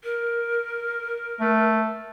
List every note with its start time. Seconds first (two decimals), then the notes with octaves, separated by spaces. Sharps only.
0.04 A#4
1.40 A3